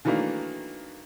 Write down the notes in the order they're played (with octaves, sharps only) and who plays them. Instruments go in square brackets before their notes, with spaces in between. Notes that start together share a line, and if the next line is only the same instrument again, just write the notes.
[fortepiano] D#3 E3 F#3 A3 A#3 D4